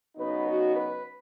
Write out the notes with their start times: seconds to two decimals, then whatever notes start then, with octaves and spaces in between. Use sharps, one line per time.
0.17 C#3 F#3 B3 D#4 B4
0.45 F#4
0.73 B4